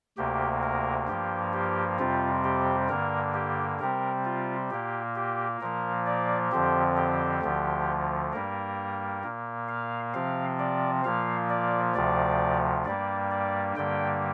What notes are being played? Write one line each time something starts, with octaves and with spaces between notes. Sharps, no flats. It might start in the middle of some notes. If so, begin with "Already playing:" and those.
D2 C3 A#3 G4
A#4
G2 F3 A#3 G4
G4
F2 C3 G3 C4 F4
G4
G2 D3 A#3 A#4
G4
C3 G3 C4 A#4
F4
A#2 A#3 G4
G4
A#2 F3 A#3 A#4
D5
F2 D3 F3 C4 G4
G4
D2 D3 F3
G2 G3 A#3 A#4
A#2 A#3
F5
C3 F3 C4 F5
D5
A#2 F3 A#3 F5
D5
D2 C3 F3 D5
G2 G3 A#3 D5
D5
G2 D3 G3 A#3 G5